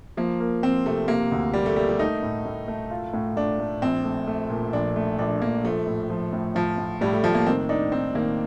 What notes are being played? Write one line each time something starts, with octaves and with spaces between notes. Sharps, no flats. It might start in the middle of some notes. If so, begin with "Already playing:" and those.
F3 A#3
A#3
F3 C4
C3 A3
C3 A#3
D2
G3 A#3
A3
G3 A#3
G3
A3 D#4
A2
A2
A3
F4
A2
A3 D4
A3
A#1 C4
A3
A3
A#2
A#1 D4
A3
A#1 D4
A#1 A#3
F3 A3
A2
F3
A2
A2 F3
A2
A2 G3
A3
A2 F3
A#3
D#3 C4
D4 D#4
C4 D#4
D#3 A#3